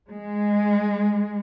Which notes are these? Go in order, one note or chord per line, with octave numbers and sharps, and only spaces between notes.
G#3